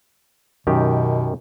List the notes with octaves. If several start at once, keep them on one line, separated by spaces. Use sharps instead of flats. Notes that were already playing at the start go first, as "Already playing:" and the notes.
F#2 B2 D#3 G4